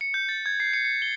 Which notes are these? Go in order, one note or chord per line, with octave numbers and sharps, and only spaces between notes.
C#7
G6
A6
G#6
C7
C#7
C#7
G7